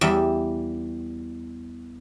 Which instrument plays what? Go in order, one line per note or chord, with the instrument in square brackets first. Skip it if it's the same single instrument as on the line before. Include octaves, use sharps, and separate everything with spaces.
[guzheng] E2 G3 E5